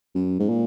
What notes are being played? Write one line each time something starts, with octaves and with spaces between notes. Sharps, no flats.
F#2
G#2
A#2